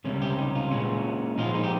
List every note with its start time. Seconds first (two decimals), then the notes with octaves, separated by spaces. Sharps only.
0.04 C#2 C3 G3 C#4
0.21 G4
0.38 D#4
0.55 F4
0.71 A#2 G#3 C#4
1.38 A#2 F3 G#3 D#4 F4
1.54 D#4
1.64 G4